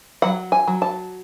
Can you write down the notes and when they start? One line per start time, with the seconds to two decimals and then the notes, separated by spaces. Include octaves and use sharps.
0.22 F#3 F#5
0.52 G#5
0.68 F#3
0.82 A5